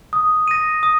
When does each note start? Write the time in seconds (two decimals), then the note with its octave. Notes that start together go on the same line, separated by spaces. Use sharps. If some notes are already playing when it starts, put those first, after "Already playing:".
0.13 D#6
0.48 A#6 D#7
0.83 D#6